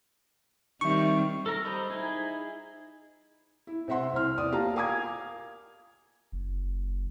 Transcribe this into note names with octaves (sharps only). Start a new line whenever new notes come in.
D#3 G3 C4 D#4 E5 C#6
A4 A#4 A#5
G3 C5 D#5 A#5 B5
D#4 E4 G#4
E4
C3 C4 E5 F#5 C6
C2 C5 F6
E2 D5 D#6
A#3 F4 G4 F5 A5 A#5
A#4 F5 G#5 D6 D#6 G#6
F#1